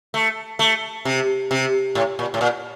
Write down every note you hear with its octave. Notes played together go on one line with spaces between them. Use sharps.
A3
A3
C3
C3
A2
A#2
A2
A#2